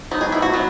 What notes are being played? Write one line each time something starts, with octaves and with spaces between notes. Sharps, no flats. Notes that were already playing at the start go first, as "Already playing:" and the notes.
F#3 B3 D#4
G#4
E4
F#4
F#3 B3